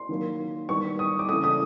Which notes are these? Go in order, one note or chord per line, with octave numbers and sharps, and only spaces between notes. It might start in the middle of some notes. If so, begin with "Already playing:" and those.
Already playing: C6
D#3 F#3 A#3
D#3 G3 B3 C#6
D#6
D6
C#3 E3 A3 D#6
D#6